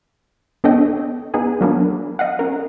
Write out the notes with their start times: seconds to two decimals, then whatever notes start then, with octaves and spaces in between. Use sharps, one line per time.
0.64 B3 D4 A4 C#5 D#5 G5
1.34 B3 D#4 G#4 G#5
1.61 F#3 A#3 B3 D4
2.19 D#5 F5 F#5
2.39 C#4 A#4